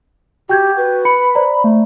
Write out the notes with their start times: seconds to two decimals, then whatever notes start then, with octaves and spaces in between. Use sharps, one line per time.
0.49 F#4 G4 G5 G6 G#6
0.77 B4
1.05 B5 C#7
1.35 C5 D5 A#5
1.64 A3